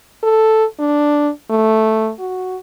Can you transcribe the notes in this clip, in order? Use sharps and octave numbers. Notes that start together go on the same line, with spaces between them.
A4
D4
A3
F#4